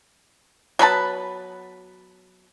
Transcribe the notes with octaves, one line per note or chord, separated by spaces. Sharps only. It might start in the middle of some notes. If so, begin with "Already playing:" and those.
F#3 B3 B4 A5